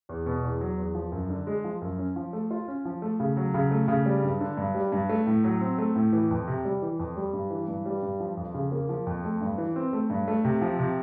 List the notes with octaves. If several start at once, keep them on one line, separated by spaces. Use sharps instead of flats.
E2
B2
E2
F#3
E2
F3
F#2
D3
G#3
F3
F#2
C#4
F3
A3
F4
C#4
F3
A3
C#3
F#3
C#3
A3
C#3
G3
G2
D3
G2
G3
G2
A3
A2
F#3
C4
A3
A2
E3
F2
C3
G3
E3
F2
G3
G2
E3
G2
G3
G2
F3
F2
C#3
A#3
F3
F2
A3
G2
E3
C4
A3
G2
A3
C3
F3
C3